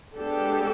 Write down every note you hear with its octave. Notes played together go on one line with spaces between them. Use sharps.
G#3 B3 D4 G4 A4